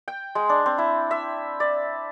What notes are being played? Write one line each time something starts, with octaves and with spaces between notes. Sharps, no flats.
G5
G#3
D4
C4
E4
E5
D5